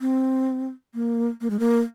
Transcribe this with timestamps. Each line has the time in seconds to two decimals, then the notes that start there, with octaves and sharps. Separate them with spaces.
0.01 C4
0.94 A#3
1.41 A#3
1.50 G#3
1.60 A#3